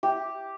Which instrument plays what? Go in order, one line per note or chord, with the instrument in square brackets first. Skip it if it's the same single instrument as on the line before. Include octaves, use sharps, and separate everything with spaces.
[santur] G4